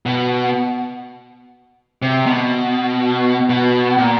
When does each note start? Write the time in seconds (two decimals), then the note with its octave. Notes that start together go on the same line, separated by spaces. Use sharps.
0.06 B2
2.02 C3
2.26 B2
3.50 B2
3.98 A#2